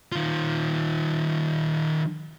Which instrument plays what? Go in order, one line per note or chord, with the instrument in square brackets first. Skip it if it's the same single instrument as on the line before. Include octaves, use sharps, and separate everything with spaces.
[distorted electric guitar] D#3 F4